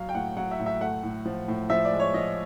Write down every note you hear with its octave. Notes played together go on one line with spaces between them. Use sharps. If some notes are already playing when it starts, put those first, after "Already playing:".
Already playing: F#3 F5
G5
A2 F#5
F#3 F#5
E5
A2
E5
A3 F#5
A2
F3
A2
F3 E5
D5
G#3
C#5
F3 D#5